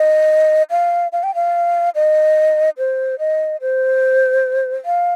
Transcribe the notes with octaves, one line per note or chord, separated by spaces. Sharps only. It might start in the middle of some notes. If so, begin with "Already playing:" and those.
Already playing: D#5
F5
F5
G5
F5
D#5
C5
D#5
C5
F5